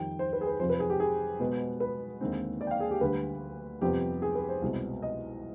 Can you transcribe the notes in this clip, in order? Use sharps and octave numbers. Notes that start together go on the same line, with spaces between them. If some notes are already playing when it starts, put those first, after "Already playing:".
Already playing: F2 D#3 G3 G5
C5
B4
G#4
B4
F2 C3 F3 C5
B4
G#4
G4
G#4
B2 G#3 B3
B4
D#2 D3 G#3 C4
D5
G5
F5
G#4
G4
D2 D3 G3 B4
F2 C3 G3 B3 G4
G#4
B4
C5
C2 B2 G#3 C4
D#5